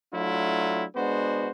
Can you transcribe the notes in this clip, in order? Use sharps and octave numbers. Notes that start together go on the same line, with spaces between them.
F#3 A3 D4 E4 F4
G#3 B3 D4 F#4 C5